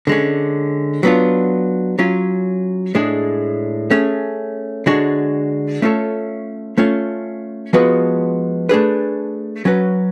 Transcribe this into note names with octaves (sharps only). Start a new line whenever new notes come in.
D3 G#3 C#4
F#3 B3 D4 F4
F#3 C#4 F4
A2 G#3 D4 G#4
A3 C#4 G#4
D3 G#3 D4 F#4 C#5
A3 C#4 F4 A4 C#5
A3 C#4 F4
F3 G#3 B3 F#4 B4
A3 D4 G#4 B4
F#3 C#4 F#4 B4